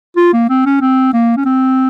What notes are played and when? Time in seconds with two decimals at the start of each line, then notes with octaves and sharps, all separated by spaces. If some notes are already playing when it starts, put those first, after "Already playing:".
0.17 F4
0.33 A#3
0.49 C4
0.66 C#4
0.81 C4
1.13 A#3
1.37 C#4
1.45 C4